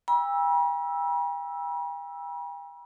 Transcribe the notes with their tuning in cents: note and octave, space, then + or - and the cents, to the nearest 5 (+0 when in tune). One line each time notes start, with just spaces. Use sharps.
G5 +40 B5 -45 E6 +0